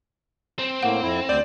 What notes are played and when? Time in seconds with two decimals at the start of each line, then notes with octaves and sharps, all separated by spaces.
0.59 C4
0.83 A2 A#3 F#5
1.02 F2 E4
1.29 D2 D5 G6